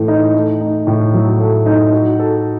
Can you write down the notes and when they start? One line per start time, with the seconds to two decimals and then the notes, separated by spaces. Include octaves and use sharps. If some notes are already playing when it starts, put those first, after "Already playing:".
Already playing: A2 E3 A3
0.08 D#4
0.34 A3
0.61 D#4
0.87 A2
1.13 F#3
1.40 A3
1.66 D#4
1.93 F#4
2.19 A4